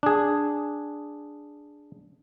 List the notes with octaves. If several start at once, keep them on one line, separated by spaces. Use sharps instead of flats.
D4 G#4